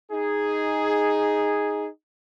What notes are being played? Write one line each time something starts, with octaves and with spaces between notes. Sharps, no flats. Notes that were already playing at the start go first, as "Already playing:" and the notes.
D#4 G#4